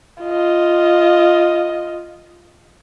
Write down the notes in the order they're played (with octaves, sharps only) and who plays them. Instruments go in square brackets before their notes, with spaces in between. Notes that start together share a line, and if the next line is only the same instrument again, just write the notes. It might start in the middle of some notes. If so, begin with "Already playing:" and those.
[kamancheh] F4 D#5